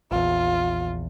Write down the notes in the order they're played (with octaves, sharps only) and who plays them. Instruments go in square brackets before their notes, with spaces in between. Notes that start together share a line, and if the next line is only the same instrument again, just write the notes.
[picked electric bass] A#1 E2 [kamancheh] F4